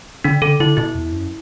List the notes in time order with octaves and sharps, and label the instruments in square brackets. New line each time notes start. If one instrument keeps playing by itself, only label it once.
[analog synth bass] D3 [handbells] D4
[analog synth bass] D3 [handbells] A4
[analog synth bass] D3 [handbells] E4
[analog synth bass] B2 [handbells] E4
[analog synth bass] E2
F#2